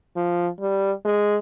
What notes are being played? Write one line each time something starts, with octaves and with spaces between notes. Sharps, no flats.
F3
G3
G#3